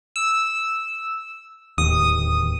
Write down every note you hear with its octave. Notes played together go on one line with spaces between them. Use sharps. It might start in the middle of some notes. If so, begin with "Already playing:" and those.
E6
D1 D#2 D#6